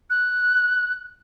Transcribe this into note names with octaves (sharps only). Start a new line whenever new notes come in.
F#6